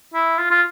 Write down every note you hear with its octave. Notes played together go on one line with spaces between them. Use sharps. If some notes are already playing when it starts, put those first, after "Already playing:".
E4
F4
F4